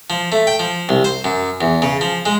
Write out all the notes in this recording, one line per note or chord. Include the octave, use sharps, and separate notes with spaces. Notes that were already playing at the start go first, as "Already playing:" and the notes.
F3
A3
G5
F3
C2
C5
F#2
E2
C#3
F3
G#3